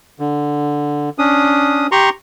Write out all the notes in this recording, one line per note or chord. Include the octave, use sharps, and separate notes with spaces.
D3
C#4 D4 D#6
G4 A#5 C6 C#6